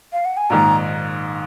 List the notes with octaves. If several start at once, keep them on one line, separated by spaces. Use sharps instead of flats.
F5
F#5
G#5
A#1 G#2 D#3 A#5